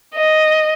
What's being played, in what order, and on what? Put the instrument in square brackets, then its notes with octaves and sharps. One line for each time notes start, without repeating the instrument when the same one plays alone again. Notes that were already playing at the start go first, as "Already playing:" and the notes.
[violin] D#5